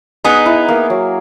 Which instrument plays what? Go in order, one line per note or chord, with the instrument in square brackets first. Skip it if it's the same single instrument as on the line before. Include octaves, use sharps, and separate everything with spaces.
[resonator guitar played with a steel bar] B3 D#4 [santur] G#4
[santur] E4
A#3
F#3